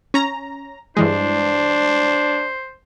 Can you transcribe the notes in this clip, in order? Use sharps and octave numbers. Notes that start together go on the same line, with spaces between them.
C#4 A#5
G2 E3 G#3 D4 C5